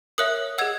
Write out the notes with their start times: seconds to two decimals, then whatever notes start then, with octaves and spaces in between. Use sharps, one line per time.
0.18 A#4 C#5 E5 D#6 F#6
0.58 G#4 D#5 F#5 E6 G#6